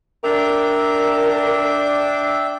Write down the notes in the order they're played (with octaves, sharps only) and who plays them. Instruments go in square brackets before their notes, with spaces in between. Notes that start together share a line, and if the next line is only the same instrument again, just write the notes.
[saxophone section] D4 [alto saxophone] A#4 [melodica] E5 G5 D6